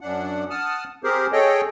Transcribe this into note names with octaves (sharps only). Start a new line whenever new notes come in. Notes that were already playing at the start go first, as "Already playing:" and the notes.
F#2 D4 F#5
F#5 A5 D#6 F6
C4 G4 G#4 A#4 C5
G#4 A4 C#5 D#5 G5